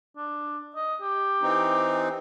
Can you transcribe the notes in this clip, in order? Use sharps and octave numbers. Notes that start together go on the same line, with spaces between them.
D4
D#5
G4
E3 C4 D#4